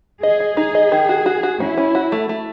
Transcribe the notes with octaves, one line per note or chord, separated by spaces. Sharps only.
G#4 D#5
D#5
D#4 G#4
D#5
D#3
F#4
F#4
F#4
C#4 E4
C#4
F#4
A3
A3